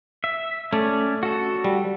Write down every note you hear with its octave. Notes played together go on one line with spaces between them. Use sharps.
E5
A3 C#4 D5
F#4 A4
G3